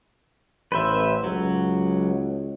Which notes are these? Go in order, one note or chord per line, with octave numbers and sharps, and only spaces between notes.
A1 B4 C5 E5
C#2 F#3